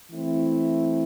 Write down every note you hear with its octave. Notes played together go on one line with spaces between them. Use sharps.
E3 A3 C4 E4